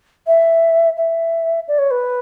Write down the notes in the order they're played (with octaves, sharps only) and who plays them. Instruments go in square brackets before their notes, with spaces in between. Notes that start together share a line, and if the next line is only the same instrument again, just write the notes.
[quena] E5
E5
D5
C#5
B4